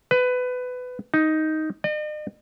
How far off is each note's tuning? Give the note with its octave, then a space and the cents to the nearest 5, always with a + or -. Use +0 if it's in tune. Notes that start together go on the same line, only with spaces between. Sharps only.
B4 +20
D#4 +5
D#5 -45